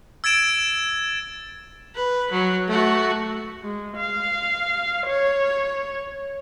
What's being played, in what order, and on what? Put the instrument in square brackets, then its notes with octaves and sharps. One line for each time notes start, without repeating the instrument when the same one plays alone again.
[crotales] E6 G#6 A6 D7 E7
[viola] B4
F#3
A3 F#4
G#3
F5
C#5